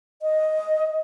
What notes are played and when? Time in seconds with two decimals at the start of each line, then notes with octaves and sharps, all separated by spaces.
0.22 D#5